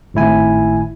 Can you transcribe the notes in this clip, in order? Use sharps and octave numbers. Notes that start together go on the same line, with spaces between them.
G#1 A2 E4 G#5